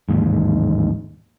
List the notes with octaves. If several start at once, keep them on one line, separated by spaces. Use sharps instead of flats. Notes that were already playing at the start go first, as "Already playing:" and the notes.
A1 D#2 G#2